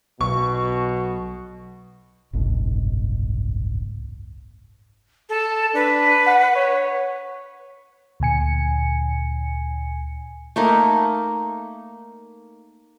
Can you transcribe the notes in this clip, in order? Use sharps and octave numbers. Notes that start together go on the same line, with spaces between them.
B1 B2 C#6
F#1 C2 G#2 B2
A4
D4 B4
F#5
C#5
D2 A#2 G#5 C#7
A3 A#3 D#4